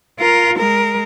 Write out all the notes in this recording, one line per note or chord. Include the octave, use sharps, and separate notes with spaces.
F4 A#4
G#3 A#4